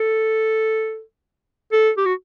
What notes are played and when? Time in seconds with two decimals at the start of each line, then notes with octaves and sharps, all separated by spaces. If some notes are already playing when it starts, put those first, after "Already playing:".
Already playing: A4
1.72 A4
1.97 G4
2.06 F#4